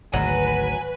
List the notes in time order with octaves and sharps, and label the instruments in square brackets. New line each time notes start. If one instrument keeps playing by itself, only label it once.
[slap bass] G#1 D2 [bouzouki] F#3 [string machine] B4 [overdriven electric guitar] G#5